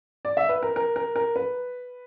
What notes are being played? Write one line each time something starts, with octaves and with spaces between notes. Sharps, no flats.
D5
E5
B4
A#4
A#4
A#4
A#4
B4